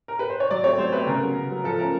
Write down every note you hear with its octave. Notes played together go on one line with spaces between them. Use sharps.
A#4
B4
C5
C#5
F#3 D5
A3 C4 C#5
F#3 C5
A3 C4 B4
C#3 A#4
F#3 B3
C#3
F#3 B3
F3 A4
A3 C#4 A#4